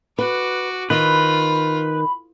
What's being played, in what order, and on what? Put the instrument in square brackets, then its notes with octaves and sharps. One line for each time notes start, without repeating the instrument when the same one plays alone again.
[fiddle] F#4 D6 [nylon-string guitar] B4
[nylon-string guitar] D#3 [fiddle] F4 [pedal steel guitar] B4 [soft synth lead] B5